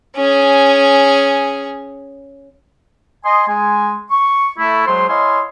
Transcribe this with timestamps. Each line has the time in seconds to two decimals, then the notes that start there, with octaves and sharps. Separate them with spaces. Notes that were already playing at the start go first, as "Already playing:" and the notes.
0.16 C#4 G#4
3.25 D#5 G#5 C6
3.48 G#3 G#5
4.11 C#6
4.58 A3 E4
4.87 F#3 G#3 C5 C6
5.09 E4 C#5 D#5 F5 G#5 C6